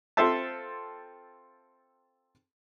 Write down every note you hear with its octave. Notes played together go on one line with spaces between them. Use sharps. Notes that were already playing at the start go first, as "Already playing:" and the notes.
C4 F4 A4 C5 E5 A5